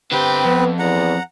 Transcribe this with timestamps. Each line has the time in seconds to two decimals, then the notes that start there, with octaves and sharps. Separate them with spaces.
0.12 D3 C4 G4 B4
0.44 F2 B3
0.79 E2 F#5 A#5